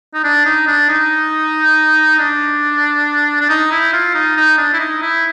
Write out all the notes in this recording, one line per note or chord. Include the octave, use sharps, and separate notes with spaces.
D#4
D4
D#4
D4
D#4
D4
D4
D#4
E4
F4
D#4
D#4
D4
E4
D#4
E4